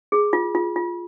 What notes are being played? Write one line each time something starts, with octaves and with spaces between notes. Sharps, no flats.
G#4
F4
F4
F4